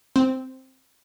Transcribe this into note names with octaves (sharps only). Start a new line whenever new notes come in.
C4